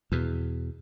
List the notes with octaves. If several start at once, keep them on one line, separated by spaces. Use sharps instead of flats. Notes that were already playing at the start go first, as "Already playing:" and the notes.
E2 B2